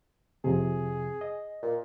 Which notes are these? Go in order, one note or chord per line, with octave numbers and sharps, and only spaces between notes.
F2 C3 G#4
D#5
A#2